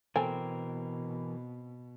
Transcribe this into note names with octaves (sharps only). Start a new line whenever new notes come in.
B2 E3 C4 A4 A#4 G#5